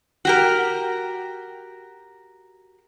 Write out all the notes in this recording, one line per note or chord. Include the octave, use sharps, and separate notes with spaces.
F#4 G4 A#4